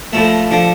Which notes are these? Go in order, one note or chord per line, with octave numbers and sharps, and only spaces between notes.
A2 F3 A3
D3 F3